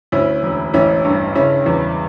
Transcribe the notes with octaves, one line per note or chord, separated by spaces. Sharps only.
D2 C#4 E4
E1
A1 C#4 E4
G2
C#3 C#4 E4
E2